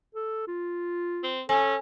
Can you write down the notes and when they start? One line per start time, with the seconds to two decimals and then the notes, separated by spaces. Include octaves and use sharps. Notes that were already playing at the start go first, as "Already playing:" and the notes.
0.15 A4
0.47 F4
1.23 C4
1.49 C#4 A4 G#5